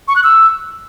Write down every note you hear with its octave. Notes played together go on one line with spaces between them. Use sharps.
C#6
F#6
E6